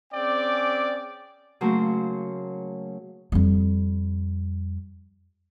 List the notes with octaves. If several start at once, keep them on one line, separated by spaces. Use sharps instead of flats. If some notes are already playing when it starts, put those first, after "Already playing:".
C4 C#4 G#4 D5 G5 D6
C#3 F#3 A3 A#3 C5
F2 G3